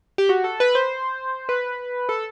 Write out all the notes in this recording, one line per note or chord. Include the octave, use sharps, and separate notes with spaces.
G4
F#4
A4
B4
C5
B4
A4